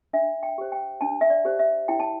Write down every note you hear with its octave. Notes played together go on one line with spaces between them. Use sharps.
D4 E5
G5
G4 C5
G5
D4 A5
E5
D5
G4 C5
E5
E4 G5
A5